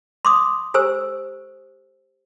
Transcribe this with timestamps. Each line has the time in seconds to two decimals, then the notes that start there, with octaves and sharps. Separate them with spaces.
0.25 C6 D6 D#6
0.74 G4 A4 C5 G#5 E6